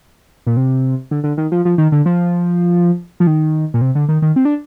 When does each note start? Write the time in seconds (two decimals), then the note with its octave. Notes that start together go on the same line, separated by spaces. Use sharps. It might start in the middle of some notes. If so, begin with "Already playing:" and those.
0.47 A#2
0.57 C3
1.11 D3
1.24 D3
1.37 D#3
1.52 F3
1.65 F3
1.78 D#3
1.92 D3
2.06 F3
3.20 F3
3.27 D#3
3.74 A#2
3.81 C3
3.95 D3
4.09 D#3
4.22 D#3
4.36 C4
4.45 D4